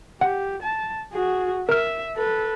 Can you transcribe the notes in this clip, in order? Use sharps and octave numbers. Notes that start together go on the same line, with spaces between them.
G4 F#5
A5
F#4 G#4
A#4 E5 F6
A4 B4